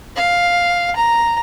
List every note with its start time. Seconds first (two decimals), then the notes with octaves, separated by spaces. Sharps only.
0.16 F5
0.96 A#5